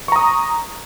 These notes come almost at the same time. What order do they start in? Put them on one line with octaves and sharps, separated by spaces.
C#6 A#5 D#6